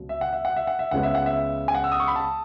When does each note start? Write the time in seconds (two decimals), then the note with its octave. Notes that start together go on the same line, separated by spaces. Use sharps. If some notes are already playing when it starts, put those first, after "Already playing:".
Already playing: C#2 B2 F#3
0.09 E5
0.21 F#5
0.33 E5
0.45 F#5
0.56 E5
0.67 F#5
0.79 E5
0.91 C#2 C#3 G#3 B3 F#5
1.03 E5
1.15 F#5
1.26 E5
1.68 G#5
1.75 F#5
1.84 E6
1.92 D#6
2.00 C#6
2.08 B5
2.16 A5